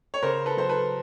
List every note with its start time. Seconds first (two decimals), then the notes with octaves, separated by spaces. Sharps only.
0.14 C#5
0.23 C#3 A#4 C5
0.46 A4 B4
0.57 F#3 C5
0.69 A4 B4